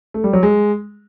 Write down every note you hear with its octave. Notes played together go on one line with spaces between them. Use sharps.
A3
G3
F#3
G#3